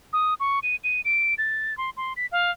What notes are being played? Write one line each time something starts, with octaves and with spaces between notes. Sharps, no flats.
D#6
C#6
D#7
D#7
D7
A6
C6
C6
B6
F5